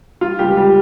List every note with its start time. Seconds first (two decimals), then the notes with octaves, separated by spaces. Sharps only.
0.21 G3 F4
0.39 C#2 G3 G4
0.57 G3 G4